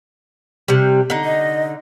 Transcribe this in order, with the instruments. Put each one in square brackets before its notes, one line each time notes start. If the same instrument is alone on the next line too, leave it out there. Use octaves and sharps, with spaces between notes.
[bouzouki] C3 G3
D3 D#4
[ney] D#5